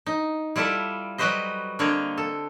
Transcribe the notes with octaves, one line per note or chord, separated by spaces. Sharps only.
D#4
G3 E4 F4 A4 D5 E5
F#3 G3 F#4 B4 C5 D#5
D3 A#3 C4 C#5 D#5
A4